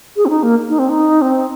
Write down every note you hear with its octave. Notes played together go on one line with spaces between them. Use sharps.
G#4
C4
D#4
A#3
D#4
C4
D#4
C4